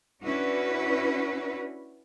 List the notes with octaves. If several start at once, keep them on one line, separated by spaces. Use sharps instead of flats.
C#4 D4 E4 F#4 B4